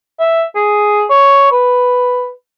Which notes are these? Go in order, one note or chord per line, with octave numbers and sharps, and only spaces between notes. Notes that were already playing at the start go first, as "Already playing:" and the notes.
E5
G#4
C#5
B4